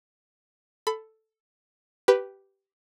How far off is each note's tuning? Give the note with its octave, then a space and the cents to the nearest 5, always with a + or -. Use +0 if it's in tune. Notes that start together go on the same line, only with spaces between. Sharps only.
A4 +0 B5 +20
G4 -10 B4 +0